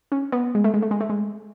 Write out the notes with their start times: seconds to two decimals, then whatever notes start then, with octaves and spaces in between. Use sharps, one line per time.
0.12 C#4
0.32 B3
0.55 G#3
0.64 A3
0.74 G#3
0.82 A3
0.91 G#3
1.00 A3
1.09 G#3